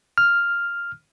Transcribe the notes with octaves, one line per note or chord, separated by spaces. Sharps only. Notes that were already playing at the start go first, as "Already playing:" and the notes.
F6